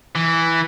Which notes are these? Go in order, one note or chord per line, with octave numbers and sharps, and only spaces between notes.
E3